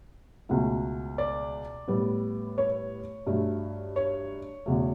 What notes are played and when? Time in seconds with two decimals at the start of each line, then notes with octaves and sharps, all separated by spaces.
0.49 C#2 B2 F#3 A3
1.18 D5
1.88 A2 G3 B3
2.58 C#5
3.27 G2 F#3 A3
3.96 C#5
4.66 E2 C#3 F#3 A3